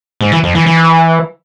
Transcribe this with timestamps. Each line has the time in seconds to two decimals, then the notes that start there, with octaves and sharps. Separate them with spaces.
0.21 G#2
0.32 E3
0.43 F2
0.55 E3
0.66 E3